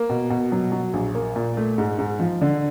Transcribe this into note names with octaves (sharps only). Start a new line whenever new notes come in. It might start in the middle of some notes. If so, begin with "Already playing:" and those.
Already playing: A#3
B2
B2
F#3
F#3
A#1
A#3
A#2
A3
G#2
G#2
F3
D3